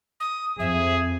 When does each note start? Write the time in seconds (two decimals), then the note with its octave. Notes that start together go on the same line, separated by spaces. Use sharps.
0.20 D#6
0.59 F2 G#4 E5